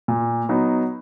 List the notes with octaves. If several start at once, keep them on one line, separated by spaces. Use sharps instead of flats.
A#2
F#3 B3 D#4